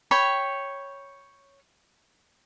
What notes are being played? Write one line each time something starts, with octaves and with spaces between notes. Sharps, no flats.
C#5 G5 B5